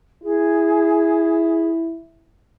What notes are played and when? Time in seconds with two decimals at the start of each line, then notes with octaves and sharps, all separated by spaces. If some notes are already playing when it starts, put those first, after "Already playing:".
0.23 E4 G#4